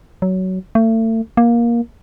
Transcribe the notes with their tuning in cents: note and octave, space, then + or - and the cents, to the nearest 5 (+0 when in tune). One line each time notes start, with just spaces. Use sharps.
F#3 +15
A3 +35
A#3 +15